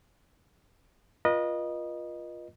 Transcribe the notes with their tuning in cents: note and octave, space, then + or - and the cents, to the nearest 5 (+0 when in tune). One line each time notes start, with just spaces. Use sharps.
F4 +0 B4 -45 D#5 -15